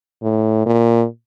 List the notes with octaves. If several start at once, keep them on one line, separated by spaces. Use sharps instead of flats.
A2
A#2